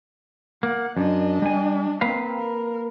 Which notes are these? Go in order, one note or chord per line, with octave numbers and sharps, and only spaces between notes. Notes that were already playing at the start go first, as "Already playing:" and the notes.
A#3 F#5
F#2 D4 D#5
G3 G#5
A#3 C4 B4 F5
A#4